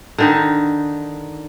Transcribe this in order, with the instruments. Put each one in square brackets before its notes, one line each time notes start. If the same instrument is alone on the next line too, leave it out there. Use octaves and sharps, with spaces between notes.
[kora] D3 D#3 D#4